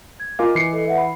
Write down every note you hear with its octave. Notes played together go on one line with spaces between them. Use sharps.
G#6
F4 A#4 D#5 F5 G#5 D6
E3 C7 C#7
A4 D#5
B4 E5 F#5
B5